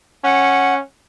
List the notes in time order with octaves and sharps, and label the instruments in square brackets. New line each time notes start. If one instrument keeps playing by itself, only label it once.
[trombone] C#4 [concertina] F#5